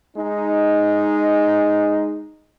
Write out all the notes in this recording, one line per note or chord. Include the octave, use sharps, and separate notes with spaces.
G#3 D#4